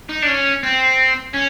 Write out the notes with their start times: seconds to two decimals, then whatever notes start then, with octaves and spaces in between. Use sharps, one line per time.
0.09 D#4
0.23 D4
0.27 C#4
0.63 C4
1.33 C#4